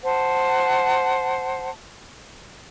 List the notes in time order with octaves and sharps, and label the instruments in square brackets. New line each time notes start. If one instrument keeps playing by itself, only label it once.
[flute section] C5 F#5 A5